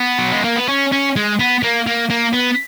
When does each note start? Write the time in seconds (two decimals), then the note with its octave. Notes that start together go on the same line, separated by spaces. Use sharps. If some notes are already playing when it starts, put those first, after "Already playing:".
Already playing: B3
0.19 F#3
0.32 G#3
0.44 A#3
0.56 B3
0.69 C#4
0.92 C#4
1.16 G#3
1.39 B3
1.63 A#3
1.87 A#3
2.10 A#3
2.33 B3